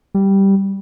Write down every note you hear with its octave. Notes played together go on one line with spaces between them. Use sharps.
G3